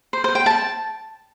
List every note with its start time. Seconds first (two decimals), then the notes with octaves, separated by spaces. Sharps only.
0.13 C5
0.24 C5
0.35 G5
0.46 A5